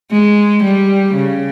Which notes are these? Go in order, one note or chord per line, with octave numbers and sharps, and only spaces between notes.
G#3
G3
C#3